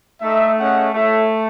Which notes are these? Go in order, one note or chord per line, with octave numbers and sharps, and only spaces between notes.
A3 D#4 A4 E5
C#4 G#4 D#5 F#5
A3 E4 A4 C#5 E5